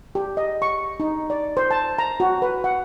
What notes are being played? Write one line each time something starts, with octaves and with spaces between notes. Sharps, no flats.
G4
D#5
C#6
D#4
D5
C5
A5
A#5
F#4
B4
F#5